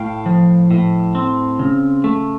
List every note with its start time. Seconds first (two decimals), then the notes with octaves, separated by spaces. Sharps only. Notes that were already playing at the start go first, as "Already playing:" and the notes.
Already playing: A2 F5 G5
0.26 F3
0.71 A2
1.15 C4
1.59 C#3
2.04 A3